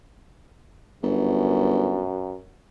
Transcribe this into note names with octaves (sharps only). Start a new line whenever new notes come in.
G1 F#2